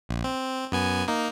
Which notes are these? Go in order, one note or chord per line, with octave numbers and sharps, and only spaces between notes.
A#1
C4
F#2 B3 G#5
A#3 D#4